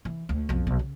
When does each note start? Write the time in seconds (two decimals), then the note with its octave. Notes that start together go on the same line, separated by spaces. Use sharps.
0.05 E3
0.29 D2
0.49 B1 F2
0.67 B1
0.79 C#3